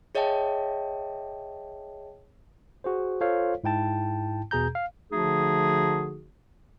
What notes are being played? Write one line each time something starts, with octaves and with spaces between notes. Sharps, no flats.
G#4 C#5 D#5 E5 G5 A5
F#4 G#4 C5
F4 A4 C5 C#5 F5
G#2 E4 G5 A5
E2 B2 G#4 A#5 G6
F5
D3 F3 A3 D#4 F#4 G#4